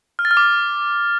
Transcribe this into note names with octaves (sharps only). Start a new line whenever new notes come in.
F6
A6
F6
D6